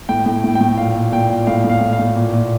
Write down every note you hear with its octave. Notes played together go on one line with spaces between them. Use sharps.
A2 G5
A2
A2
G5
A2
A#2 F5
A#2
A#2 G5
A#2
A2 F5
A2 F5
A2
F5
A2
A#2
A#2